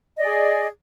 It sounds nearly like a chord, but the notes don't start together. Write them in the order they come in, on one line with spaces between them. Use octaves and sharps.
D#5 D5 G#4